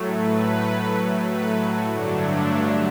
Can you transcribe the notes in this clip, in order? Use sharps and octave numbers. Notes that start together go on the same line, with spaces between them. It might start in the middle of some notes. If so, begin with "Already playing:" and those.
Already playing: A2 F#3 A3
B4
B4
F#4
G2 D3 F#3 A3 D4